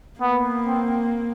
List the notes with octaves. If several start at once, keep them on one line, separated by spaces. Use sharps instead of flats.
A#3 B3
C4